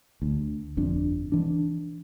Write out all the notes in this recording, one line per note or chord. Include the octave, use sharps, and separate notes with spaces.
D2
G1 F2 D4
E3 D4